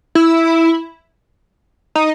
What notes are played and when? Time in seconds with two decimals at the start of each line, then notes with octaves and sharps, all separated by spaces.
0.15 E4
1.95 D#4